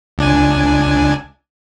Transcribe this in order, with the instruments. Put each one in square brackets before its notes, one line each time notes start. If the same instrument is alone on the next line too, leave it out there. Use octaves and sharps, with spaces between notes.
[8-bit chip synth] C#2 D4 G#5